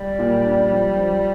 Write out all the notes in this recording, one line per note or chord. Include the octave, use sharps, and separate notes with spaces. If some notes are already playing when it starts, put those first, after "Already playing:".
Already playing: G3
A#2
D4
F3
F3